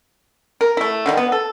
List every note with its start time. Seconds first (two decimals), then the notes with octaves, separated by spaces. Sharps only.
0.61 A#4
0.77 A3 E4
1.06 D3 D#3 F#3 G3
1.17 B3
1.32 A4